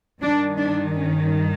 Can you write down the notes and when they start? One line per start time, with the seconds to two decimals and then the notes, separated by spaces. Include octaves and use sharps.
0.22 G2 D#3 D4
0.58 D4
0.94 C#4